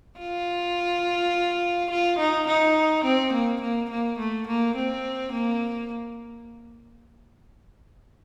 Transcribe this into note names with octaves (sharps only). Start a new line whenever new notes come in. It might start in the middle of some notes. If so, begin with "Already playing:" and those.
F4
F4
D#4
D#4
C4
A#3
A#3
A#3
A3
A#3
C4
A#3